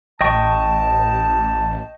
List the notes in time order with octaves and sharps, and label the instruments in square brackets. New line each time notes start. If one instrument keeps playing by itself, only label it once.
[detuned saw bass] A1 [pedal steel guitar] D#5 G5 C#6 [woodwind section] A5